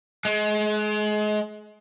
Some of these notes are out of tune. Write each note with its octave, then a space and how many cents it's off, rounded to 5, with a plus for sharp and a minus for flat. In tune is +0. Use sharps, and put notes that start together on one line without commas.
G#3 +30